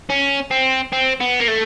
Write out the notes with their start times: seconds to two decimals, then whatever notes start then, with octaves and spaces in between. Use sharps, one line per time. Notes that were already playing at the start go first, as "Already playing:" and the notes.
0.10 C#4
0.51 C4
0.92 C4
1.20 B3
1.40 A#3
1.48 A3